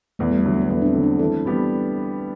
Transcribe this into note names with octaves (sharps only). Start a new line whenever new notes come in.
E2 A3
G3
A3
D3 F#3
B3
A3
E2 B3
D4
C4
D3 F#3
D4
E3 A4
G3 B3 D4 G4